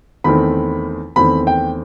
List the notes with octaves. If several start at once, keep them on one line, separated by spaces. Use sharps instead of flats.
E2 D#3 A3 C4 B5
E2 D#3 A3 C4 B5
G5